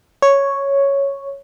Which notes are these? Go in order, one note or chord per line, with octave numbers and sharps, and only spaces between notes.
C#5